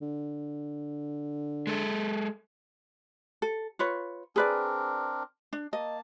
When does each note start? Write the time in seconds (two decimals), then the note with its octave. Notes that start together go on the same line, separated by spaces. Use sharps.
0.02 D3
1.67 G#3 A4
3.42 A4
3.79 F4 B4 C#5
4.36 C4 D4 G#4 A#4 B4 D5
5.53 D4
5.73 A#3 D#5 A5